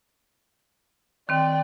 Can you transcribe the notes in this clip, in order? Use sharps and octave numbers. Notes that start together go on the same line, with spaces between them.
D#3 C4 D5 G5